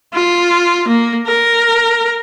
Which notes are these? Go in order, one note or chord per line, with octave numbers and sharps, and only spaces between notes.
F4
A#3
A#4